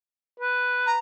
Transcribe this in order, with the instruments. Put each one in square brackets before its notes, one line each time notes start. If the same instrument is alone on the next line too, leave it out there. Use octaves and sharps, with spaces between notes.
[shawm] B4
[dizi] A#5